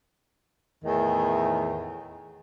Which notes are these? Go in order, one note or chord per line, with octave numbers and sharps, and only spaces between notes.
E2 A2 D#3